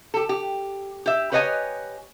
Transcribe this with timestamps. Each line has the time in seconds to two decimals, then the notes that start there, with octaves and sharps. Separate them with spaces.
0.14 G4 A4
0.29 G4
1.06 G4 E5
1.32 G4 B4 C#5 D#5 E5 G#5